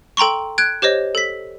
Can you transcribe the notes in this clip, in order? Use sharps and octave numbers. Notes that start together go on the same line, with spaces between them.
A4 G5 A#5 C6 C#6
F#6 G#6 D7
G4 C5 C#5 D#5
A4 B6